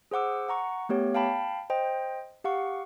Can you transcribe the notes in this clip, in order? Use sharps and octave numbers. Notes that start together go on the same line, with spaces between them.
G#4 C5 F#5 D6 E6
F#5 A#5 C#6
A3 B3 G4 C#5
F5 G5 A5 B5
C5 D#5 G5
G4 F5 F#5 C#6